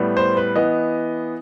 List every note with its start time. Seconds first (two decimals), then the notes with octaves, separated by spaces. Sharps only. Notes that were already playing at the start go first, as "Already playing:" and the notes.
Already playing: A2 G3 B3
0.17 C5
0.37 B4
0.56 E3 B3 D#5